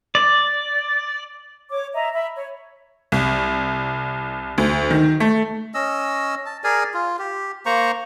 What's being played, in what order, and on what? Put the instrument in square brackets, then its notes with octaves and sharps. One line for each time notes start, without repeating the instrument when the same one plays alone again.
[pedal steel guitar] D5
[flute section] C#5 D6
D#5 E5 A#5
E5 B5
C#5
[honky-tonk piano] C2
D2
D#3
A3
[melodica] C#4 D#5 E6
A5
G#4 A#4 D5 G#5
F4
G4
A#3 C5 A#5 C#6